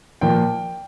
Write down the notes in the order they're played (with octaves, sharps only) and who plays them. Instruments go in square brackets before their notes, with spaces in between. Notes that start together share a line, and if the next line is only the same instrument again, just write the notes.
[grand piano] A#2 F3 A#3 G5